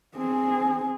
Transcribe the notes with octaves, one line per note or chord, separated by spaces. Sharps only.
C4 G#4